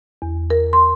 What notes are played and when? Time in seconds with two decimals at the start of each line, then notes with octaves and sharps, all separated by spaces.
0.22 E2
0.50 A#4
0.73 C6